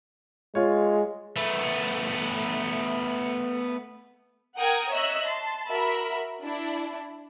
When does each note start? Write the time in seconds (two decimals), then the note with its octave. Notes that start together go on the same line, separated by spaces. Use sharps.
0.55 G#3 F4 C#5
1.36 A3 B3
4.57 A#4 F#5 G5 A#5 D#6 G#6
4.92 C#5 D#5 E5 E6 F#6
5.25 A5 C6
5.68 F#4 A#4 E5 B5
6.41 D4 E4